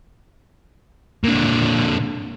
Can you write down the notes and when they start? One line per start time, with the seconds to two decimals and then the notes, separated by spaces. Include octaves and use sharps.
1.24 A#2 D3